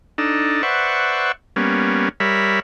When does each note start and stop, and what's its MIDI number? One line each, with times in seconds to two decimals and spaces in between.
0.18 0.62 62
0.18 0.62 63
0.18 0.62 69
0.63 1.32 71
0.63 1.32 72
0.63 1.32 74
0.63 1.32 76
0.63 1.32 78
0.63 1.32 85
1.56 2.09 55
1.56 2.09 58
1.56 2.09 59
1.56 2.09 61
2.20 2.60 55
2.20 2.60 70
2.20 2.60 73
2.20 2.60 76
2.20 2.60 83